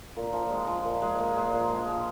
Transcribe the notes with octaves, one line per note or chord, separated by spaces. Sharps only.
A#2
F3
G#3
F3
A#2
G#3
A#2
G#3
A#2
F3
F3